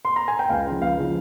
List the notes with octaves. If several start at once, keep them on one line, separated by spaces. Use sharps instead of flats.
C6
A#5
G#5
G5
C#2 F5
C#3 F3
C#2 F5
C#3 F3